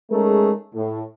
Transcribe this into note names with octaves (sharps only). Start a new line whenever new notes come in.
G#3 A3 C#4 D#4 G#4 A#4
A2